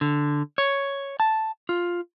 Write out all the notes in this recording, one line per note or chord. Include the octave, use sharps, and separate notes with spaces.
D3
C#5
A5
F4